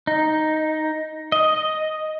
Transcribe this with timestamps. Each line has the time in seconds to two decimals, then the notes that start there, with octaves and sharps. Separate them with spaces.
0.07 D#4
1.32 D#5